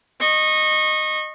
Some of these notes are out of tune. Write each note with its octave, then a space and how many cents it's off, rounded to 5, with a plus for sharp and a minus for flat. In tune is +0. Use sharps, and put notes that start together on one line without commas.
D#5 -15 C#6 -25